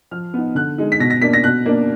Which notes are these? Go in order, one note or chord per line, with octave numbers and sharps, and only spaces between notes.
F3 F6
B3 D#4
D3 F#6
G#3 D#4
B6
B2 A#6
A#6
A#3 D4 B6
A#6
B2 F#6
A#3 D4